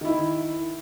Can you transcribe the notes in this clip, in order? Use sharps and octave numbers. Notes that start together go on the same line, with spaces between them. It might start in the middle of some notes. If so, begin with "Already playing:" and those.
D#3 E4